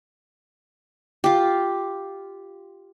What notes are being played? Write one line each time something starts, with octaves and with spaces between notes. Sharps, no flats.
F4 G4